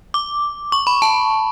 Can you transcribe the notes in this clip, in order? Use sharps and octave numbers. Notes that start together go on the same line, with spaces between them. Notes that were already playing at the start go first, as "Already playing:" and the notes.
D6
C#6
B5
A5